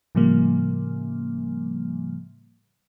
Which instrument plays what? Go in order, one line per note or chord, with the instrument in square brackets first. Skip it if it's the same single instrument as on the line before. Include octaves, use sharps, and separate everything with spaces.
[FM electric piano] A2 C#3 F3 G3 A#3